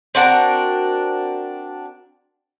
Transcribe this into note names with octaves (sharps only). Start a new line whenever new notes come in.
C4 D4 F#4 A#4